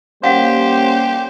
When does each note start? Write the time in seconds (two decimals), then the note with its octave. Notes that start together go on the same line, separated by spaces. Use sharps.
0.23 G3 A#3 C#4 G4 C5 F5 F#5